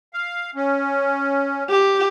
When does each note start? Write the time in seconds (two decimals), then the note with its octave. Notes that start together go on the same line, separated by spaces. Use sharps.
0.14 F5
0.55 C#4
1.69 G4